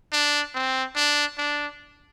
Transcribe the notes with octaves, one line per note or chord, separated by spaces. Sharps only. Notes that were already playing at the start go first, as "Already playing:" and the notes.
D4
C4
D4
D4